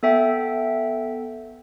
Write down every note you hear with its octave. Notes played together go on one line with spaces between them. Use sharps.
B3 A4 E5 G5